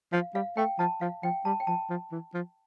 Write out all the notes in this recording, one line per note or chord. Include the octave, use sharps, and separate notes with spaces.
F3 F5
G3 F5
A3 G5
F3 A5
F3 F5
F3 G5
G3 A5
G5
F3 A5
F3
E3
F3